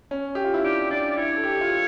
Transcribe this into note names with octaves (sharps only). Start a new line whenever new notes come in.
C#4
G4
F4
E4
D4 G4
D4 D5
D5
E4 C#5
A4
G4
F4
G4